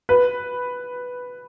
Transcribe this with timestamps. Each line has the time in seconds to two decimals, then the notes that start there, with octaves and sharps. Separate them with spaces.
0.09 B4